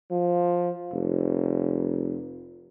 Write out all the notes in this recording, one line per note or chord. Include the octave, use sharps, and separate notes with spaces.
F3
F1